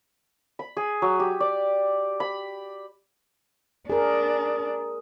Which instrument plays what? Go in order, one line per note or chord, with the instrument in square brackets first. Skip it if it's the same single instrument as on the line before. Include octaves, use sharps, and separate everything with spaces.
[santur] B5
G#4
F#3
G4
D5
B5
[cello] D4 [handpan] G#4 A#4